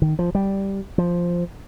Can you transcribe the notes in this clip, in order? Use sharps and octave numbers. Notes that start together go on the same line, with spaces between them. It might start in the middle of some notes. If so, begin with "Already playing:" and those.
D#3
F3
G3
F3